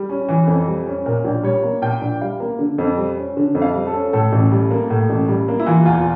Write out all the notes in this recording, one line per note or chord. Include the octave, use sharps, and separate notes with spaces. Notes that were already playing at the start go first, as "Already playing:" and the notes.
Already playing: G3
C#4
E3
F2
G3
C#4
A#2 A#4
A#1
G3 C#5
A#3
A#2 G5
A#1
G3 F5
A#3
D3
F2
G3
C#4
D3
F2
F5
G3
A4
C#4
A2 A4
A1
G3
A#3
A2
A1
G3
A#3
E4
E3 F4
E2 F4